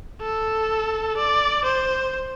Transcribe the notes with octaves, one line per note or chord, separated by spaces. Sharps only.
A4
D5
C5